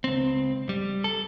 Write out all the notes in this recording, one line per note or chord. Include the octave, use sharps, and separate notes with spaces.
C#2 C4
G3
A4